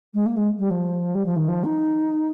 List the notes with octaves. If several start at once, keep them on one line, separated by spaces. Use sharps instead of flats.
G#3
A#3
G#3
G3
F3
G3
F3
D#3
F3
D#4